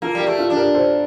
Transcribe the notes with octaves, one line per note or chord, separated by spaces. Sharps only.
A#3 F4 A4
G3
G4 A#4
A3
F4 A4
D4
G4 A#4
A4 C5